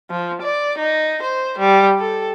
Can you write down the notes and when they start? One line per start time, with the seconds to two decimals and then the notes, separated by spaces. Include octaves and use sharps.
0.11 F3
0.42 D5
0.78 D#4
1.23 C5
1.59 G3
2.00 A4